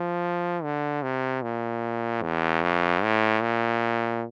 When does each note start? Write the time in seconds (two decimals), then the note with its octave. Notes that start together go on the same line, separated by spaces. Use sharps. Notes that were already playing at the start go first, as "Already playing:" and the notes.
Already playing: F3
0.63 D3
1.02 C3
1.42 A#2
2.22 E2
2.62 F2
3.03 A2
3.42 A#2